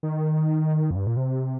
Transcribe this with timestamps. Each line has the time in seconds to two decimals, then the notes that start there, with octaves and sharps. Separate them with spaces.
0.03 D#3
0.91 F2
0.96 G2
1.07 A#2
1.17 C3